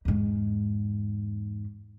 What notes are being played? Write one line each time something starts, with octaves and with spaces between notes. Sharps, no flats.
E2 G#2